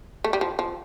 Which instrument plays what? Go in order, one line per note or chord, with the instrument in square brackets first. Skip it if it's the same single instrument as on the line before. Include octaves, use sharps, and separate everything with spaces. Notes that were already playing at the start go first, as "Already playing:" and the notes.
[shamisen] A3
G3
F3
F3